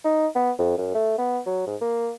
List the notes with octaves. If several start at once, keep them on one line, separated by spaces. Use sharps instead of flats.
D#4
B3
F2
F#2
A3
B3
F#3
G#2
A#3